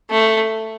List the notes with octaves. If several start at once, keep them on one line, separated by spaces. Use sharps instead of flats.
A3